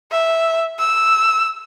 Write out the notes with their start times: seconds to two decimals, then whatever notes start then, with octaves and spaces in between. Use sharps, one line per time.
0.12 E5
0.79 E6